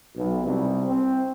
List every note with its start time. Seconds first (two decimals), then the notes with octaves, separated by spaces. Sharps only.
0.15 B1
0.44 C2
0.87 C4